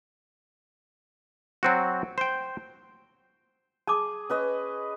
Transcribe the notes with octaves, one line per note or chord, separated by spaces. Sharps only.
F#3 C4 F#4
C5 G5
G#4 A5 D6
C#4 B4 D#5